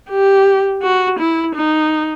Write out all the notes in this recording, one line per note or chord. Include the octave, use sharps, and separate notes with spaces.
G4
F#4
E4
D#4